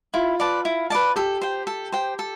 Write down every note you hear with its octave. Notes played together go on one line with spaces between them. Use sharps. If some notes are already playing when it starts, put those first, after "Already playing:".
E4 F4
B4 D5 A5
E4
B4 D5 A5
G4 A4
C5 G5
A4
C5 G5
A4